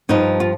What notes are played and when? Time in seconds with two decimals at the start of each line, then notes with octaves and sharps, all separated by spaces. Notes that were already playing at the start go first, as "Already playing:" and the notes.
0.09 G2 F3 D#4
0.40 F4